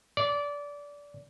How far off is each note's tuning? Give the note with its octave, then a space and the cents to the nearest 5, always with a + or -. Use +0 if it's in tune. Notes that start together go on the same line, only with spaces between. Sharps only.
D5 -20